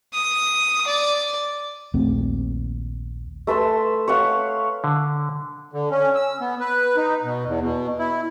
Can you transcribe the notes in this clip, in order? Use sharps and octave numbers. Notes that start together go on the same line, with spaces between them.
D#6
D5
A#1 D#2 A3 C4
A3 B4 A5 C6
C#5 F5 F#5
D3
D3
C#4
E6
B3
B4
D#4
B2
E2
B2
E4